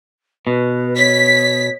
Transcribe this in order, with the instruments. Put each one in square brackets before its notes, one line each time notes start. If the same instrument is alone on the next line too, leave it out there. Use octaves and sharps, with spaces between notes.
[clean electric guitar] B2 [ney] B4
[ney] C#5 [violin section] B6